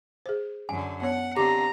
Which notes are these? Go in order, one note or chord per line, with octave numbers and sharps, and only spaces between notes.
G#4 C5
F#2 D3 G#5
B3 C#5 F#5
D3 C4 G4 A#5 D6